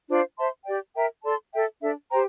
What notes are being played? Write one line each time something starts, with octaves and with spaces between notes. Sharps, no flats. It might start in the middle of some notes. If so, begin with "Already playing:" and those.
D4 F4 C5 F5
C5 E5 A5 C6
G4 D5 G5
A#4 E5 G5 A#5
A4 D5 A5 C6
A4 E5 G5
D4 A4 E5
G4 C5 G5 A#5